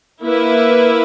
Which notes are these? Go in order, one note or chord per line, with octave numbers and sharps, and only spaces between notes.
A#3 E4 B4